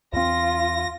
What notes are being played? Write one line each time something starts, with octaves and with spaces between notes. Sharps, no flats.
E2 C4 F4 A#6